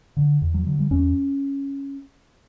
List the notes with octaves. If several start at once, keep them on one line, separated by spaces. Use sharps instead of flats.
D3
E2
F#3
D3 F#3
G3
E2 C#4